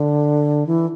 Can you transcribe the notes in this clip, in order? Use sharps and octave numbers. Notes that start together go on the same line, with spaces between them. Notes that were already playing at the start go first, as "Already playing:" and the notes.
Already playing: D3
E3